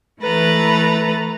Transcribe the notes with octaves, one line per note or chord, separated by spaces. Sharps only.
E3 A3 A4 B4 A#5 A6